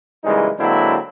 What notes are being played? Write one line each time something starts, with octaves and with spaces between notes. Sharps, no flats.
C#3 E3 G3 G#3 A#3 D#4
D3 F#3 G#3 A#3 C4 E4